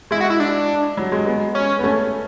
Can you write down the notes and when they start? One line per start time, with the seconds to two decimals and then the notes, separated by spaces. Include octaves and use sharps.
0.11 G#3 E4
0.21 F#4
0.30 E4
0.40 D4
0.97 F#3
1.12 G#3
1.26 G#3 B3
1.55 C#4
1.79 B3
1.84 A3 C#4